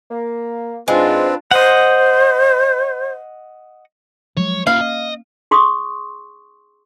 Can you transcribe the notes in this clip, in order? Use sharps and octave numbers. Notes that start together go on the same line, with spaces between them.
A#3
G#2 G#3 C4 D4 F4 B4
C5 D#5 F#5
F3 F#3 G#3 C#5
A#3 C#4 E4 F4 F5
D#5
G#4 C6 C#6 D#6